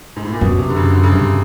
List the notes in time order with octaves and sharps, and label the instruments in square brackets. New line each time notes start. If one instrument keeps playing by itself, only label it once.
[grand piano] G#2
A2
A#2
[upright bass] F#2 [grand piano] B2
[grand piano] C3
D3
C#3
D3
C#3
[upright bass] G2 [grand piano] C3